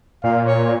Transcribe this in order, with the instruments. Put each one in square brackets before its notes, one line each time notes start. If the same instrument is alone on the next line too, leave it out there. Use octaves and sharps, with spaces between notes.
[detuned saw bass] A#2 [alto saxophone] F5
[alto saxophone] C#5